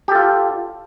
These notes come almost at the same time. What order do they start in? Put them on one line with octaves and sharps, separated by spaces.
G4 A4 F4